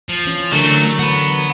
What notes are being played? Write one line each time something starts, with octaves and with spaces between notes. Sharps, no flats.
F3
E3 C#4
D3 F#3 A3 D4 A#4
F#5 B5